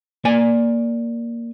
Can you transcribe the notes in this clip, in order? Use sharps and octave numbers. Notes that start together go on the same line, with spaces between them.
A#3 D5 G#5